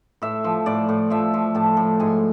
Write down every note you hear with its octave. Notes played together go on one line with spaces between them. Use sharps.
A2 E5
F3
A2 D5
A2
F3 E5
F3
A2 A5
A2
G#2 G#5